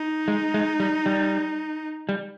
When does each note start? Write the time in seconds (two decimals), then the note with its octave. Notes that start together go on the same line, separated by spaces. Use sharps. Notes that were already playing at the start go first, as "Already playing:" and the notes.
Already playing: D#4
0.28 G#3
0.54 G#3
0.80 G3
1.06 G3
2.09 G3